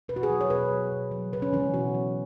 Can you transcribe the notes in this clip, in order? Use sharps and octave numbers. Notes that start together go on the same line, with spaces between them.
B2 B4
F#4
G#4
F#3
C#5
B2 B4
F#3
B2
F#3
C#3 B4
C#4
E3 G#3 C#4
B2 F#4
F#3